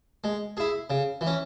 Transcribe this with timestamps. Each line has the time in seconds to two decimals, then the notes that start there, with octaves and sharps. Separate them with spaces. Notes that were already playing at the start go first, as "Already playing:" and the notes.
0.24 G#3
0.57 E4 G#4
0.90 C#3
1.21 E3
1.27 C#4